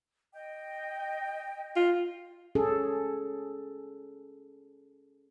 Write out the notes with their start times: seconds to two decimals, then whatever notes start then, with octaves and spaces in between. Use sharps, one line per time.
0.33 D#5 G5
1.76 F4
2.55 C#4 G#4 A4